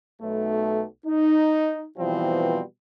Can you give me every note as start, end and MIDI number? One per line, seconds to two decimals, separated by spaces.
0.22 0.84 35
0.22 0.84 57
1.07 1.86 63
1.98 2.62 47
1.98 2.62 52
1.98 2.62 53
1.98 2.62 55
1.98 2.62 60